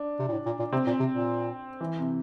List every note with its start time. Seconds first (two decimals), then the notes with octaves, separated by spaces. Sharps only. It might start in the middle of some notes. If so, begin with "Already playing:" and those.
Already playing: D4
0.19 C3
0.28 A#2
0.32 A2
0.46 A#2
0.59 A#2
0.73 C3 C4
0.86 A#2
1.00 C3
1.13 A#2
1.81 E3
1.99 C3